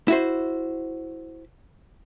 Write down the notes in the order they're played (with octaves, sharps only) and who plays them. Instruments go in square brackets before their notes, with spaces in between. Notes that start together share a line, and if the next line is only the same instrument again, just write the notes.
[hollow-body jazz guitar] E4 F#4 C5